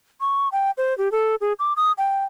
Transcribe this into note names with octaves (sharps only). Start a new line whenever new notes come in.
C#6
G5
C5
G4
A4
G#4
D6
D#6
G5